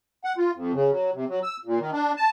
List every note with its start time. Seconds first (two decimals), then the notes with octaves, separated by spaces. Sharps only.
0.24 F#5
0.38 F4
0.54 F2
0.73 C#3
0.91 F#3
1.14 C3
1.29 F#3
1.43 E6
1.65 A#2
1.79 D#3
1.93 D4
2.17 A5